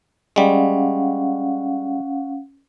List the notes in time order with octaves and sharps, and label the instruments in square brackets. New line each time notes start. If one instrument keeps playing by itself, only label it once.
[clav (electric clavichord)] G3 G#3 [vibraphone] C#4 F5 F#5